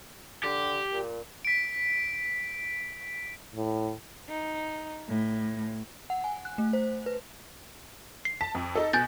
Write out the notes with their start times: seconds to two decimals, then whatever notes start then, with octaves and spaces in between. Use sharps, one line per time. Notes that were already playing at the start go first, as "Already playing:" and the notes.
0.44 D3 G4
0.93 A#2
1.45 B6 D7
3.55 A2
4.29 D#4
5.08 A2
6.10 F#5
6.24 G#5
6.45 F#6
6.58 A3
6.73 C5
7.06 B4
8.25 C7
8.41 A5 B6
8.55 F2
8.75 D#4 A4
8.93 B2 G#5 G6 A6